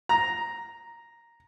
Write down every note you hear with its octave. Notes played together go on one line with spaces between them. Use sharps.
A#5